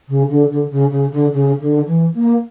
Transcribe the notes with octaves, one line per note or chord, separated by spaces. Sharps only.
C#3
D3
D3
C#3
C#3
D3
C#3
D3
E3
A#3